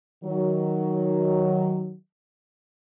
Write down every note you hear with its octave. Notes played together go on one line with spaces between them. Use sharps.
D#3 F#3